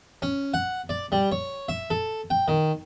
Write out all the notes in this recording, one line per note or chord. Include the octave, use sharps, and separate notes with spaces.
C#4
F#5
D5
G3
C#5
E5
A4
G5
D#3